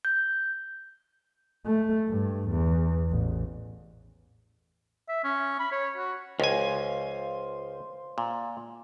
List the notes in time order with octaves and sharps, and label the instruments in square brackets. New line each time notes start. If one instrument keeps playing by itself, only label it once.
[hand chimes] G6
[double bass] A3
G2
E2
A1
[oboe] E5
C#4
B5
C#5
F#4
[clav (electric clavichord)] C#2 G#5 [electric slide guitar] C5 F5
[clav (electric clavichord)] A#2